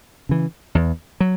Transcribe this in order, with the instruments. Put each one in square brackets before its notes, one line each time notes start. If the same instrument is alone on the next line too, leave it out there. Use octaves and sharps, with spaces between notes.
[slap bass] C#3 E3
E2
F#3